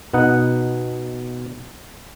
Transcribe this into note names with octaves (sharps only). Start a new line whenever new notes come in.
B2 B3 D#4 F#5